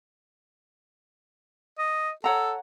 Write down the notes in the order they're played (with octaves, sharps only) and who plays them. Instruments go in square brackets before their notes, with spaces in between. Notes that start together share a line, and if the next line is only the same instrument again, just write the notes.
[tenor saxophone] D#5
[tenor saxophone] A4 [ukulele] C#5 F#5 A#5